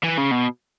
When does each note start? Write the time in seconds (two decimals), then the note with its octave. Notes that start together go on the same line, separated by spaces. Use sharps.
0.04 E3
0.18 C#3
0.32 B2